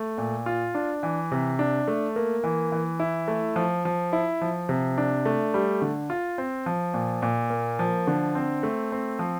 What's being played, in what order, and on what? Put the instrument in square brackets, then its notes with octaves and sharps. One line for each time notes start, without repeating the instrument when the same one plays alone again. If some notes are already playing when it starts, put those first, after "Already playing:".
Already playing: [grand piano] A3
A#2
F4
D4
E3
C3
D4
A3
A#3
E3
E3
E4
A3
F3
F3
E4
F3
C3
D4
A3
G3
D3
F4
C4
F3
A#2
A#2
A#3
F3
D3
C4
A3
C4
F3